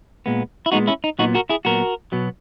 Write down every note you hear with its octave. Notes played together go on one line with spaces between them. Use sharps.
A#2 G#3 B3
E4
A#2 G#3 B3 D#4 F#4
C#4 E4
D#4
A#2 F#3 B3 D#4 F#4
F#4 A#4
E4 G#4
A#2 F#3 B3 F#4 A#4
B2 F#3 B3